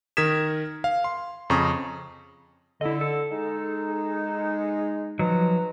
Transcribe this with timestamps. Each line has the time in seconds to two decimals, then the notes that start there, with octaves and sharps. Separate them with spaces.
0.17 D#3 A#4 D#6 G#6 B6 E7
0.84 F5
1.04 C6
1.50 F2 C#3 A#5 C#6 D#6
2.81 D3 E4 D#5
3.01 A4
3.32 G#3 D#4
5.19 F3 F#3 D#4 B4 A#5